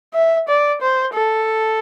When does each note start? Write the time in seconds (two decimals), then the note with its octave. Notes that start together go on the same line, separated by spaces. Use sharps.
0.14 E5
0.48 D5
0.82 C5
1.14 A4